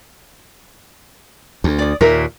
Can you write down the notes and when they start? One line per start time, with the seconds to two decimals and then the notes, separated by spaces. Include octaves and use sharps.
1.64 D2
1.79 D5 D#6
2.01 D#2 A#2 A#4 E5